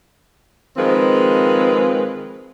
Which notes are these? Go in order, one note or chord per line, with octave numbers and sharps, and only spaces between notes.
D#3 F3 G#3 C4 B4